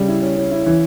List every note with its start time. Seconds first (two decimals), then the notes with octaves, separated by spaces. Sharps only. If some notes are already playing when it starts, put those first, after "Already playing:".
Already playing: C#3 G3
0.08 E4
0.22 C#4
0.37 C#4
0.52 E4
0.66 E3